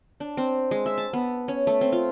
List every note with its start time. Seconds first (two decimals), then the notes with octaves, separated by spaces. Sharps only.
0.20 D4
0.37 C4
0.71 G#3
0.86 E5
0.98 A5
1.13 B3
1.48 C#4
1.67 A3
1.81 C4
1.92 F4